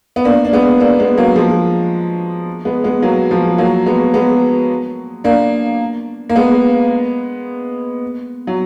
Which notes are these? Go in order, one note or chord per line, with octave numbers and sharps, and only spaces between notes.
B3
A#3 D4
D4
G#3 B3
A#3 D4
G#3 B3
F#3 A#3
F3 G#3
G#3 B3
G#3 B3
F#3 A#3
F3 G#3
F#3 A#3
G#3 B3
G#3 B3
A#3 D4
A#3
G#3 B3
F#3